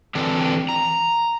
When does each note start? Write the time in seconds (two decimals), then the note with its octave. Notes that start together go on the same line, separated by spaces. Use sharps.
0.15 D3 E3 C4 D4
0.69 A#5